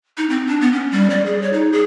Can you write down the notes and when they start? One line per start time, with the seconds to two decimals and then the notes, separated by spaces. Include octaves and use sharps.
0.17 D#4
0.30 C4
0.47 D4
0.61 B3
0.73 C#4
0.92 G3
1.10 D5
1.26 G#4
1.42 C#5
1.53 D#4
1.72 G#4